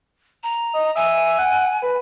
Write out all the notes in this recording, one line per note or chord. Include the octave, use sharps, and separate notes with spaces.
A#5
D#5
E5 G#5
F#5
B4